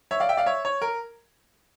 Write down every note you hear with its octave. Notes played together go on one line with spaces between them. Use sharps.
C#5 E5
D5 F5
E5 G5
D5 F5
C#5 E5
C#5
A#4